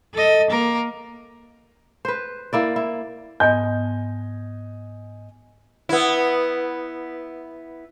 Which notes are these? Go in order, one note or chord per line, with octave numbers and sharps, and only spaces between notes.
A4 D#5
A#3 A#4
B4 C5
A#3 E4 D5
E4
G#2 B3 D#5 G#5 G6
B3 E4